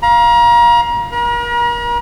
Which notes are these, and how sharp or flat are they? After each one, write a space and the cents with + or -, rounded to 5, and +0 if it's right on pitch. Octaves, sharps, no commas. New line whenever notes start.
F5 +0 A#5 +35
A#4 +40 A#5 +45